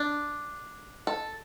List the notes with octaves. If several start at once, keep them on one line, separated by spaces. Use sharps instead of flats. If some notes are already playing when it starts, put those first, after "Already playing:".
Already playing: D4
A4